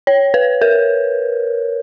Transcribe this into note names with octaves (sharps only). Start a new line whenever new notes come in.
C#5
B4
A#4